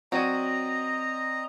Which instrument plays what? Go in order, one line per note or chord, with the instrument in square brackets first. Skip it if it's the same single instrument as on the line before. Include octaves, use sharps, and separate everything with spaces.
[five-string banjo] F#3 F#4 [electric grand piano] C4 D5 D#7 [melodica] D#5 A#5